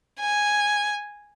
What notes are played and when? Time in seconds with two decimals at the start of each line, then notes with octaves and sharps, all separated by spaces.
0.20 G#5